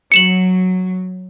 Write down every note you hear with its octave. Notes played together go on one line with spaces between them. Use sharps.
F#3 C#7 E7 F#7